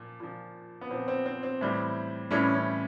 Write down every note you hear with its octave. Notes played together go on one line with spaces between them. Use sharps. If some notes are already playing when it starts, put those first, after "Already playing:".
Already playing: A#2 F3
A#2 F3
B3
A#2 F3 C4
C4
C4
C4
A2 E3 G3
A2 E3 G3 C#4
C#4